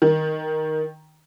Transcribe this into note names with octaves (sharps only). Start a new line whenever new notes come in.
D#3